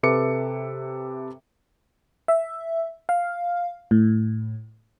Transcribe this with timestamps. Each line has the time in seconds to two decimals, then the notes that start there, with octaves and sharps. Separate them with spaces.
0.03 C3 A4 B4 E5 D6 C#7
2.28 E5
3.09 F5
3.91 A2